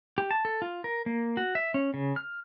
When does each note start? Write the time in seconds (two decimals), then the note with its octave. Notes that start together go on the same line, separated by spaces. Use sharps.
0.18 G4
0.31 A5
0.45 A4
0.62 F4
0.84 A#4
1.06 A#3
1.37 F#4
1.55 E5
1.74 C#4
1.94 C#3
2.16 F6